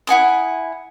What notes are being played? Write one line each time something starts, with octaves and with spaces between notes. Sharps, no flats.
E4 F#5 G#5 D#6